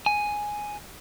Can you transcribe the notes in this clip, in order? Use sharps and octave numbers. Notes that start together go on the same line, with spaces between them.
G#5